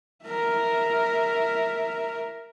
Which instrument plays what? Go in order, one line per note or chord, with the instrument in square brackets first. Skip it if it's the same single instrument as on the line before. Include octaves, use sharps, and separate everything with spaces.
[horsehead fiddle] A#4 E5